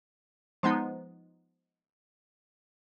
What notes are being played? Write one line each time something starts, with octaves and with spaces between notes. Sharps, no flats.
F3 G#3 B3 D#4